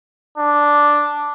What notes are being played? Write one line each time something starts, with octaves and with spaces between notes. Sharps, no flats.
D4